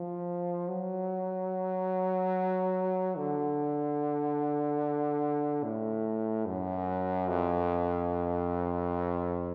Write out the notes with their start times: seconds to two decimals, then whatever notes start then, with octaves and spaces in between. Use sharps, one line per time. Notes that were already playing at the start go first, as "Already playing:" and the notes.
Already playing: F3
0.69 F#3
3.17 D3
5.64 A2
6.46 F#2
7.28 F2